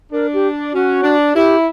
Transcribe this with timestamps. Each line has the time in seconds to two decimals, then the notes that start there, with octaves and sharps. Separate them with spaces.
0.12 D4 A#4
0.33 G4
0.73 C#4 F#4
1.04 D4
1.35 E4 G4